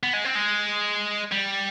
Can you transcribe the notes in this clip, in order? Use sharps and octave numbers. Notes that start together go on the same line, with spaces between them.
B3
G#3
C4
G#3
G3